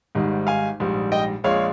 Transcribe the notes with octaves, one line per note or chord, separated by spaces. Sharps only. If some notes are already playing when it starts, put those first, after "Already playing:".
G#1 G#2 D#3 G3
F5 G#5
A#1 G#2 G3
D#5 G5
A#1 A#2 G#3 C#5 F5